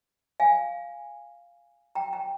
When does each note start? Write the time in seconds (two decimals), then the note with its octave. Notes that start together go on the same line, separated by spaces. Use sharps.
0.40 F5 G#5
1.95 G5 A#5
2.13 G5 A#5